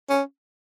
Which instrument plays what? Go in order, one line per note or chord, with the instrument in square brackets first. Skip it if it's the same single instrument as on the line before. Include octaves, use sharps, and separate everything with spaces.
[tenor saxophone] C#4